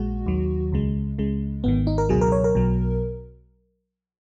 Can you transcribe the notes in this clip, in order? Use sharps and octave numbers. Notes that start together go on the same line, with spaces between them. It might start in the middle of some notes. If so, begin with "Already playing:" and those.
Already playing: A#1 A#2 G#3 F#4
D#2 D#3 F#3
C#2 C#3 G#3
C#2 C#3 G#3
G#1 G#2 D#3 B3
D#4
A#4
C#2 B2 F#3 G#4
A#4
C#5
A#4
B1 B2 F#3